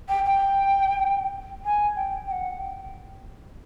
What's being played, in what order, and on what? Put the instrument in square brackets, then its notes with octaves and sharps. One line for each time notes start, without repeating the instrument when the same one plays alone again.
[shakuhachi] G5
G5
G#5
G5
G5
F#5
G5